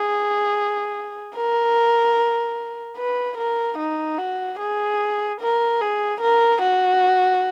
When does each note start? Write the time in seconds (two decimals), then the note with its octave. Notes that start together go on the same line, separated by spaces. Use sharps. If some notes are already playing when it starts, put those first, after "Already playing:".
Already playing: G#4
1.36 A#4
2.97 B4
3.38 A#4
3.78 D#4
4.18 F#4
4.60 G#4
5.41 A#4
5.81 G#4
6.21 A#4
6.62 F#4